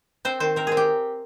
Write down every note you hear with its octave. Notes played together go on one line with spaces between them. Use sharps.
C4 C5
D#3 C5
C4 A#4
C4 G#4
G4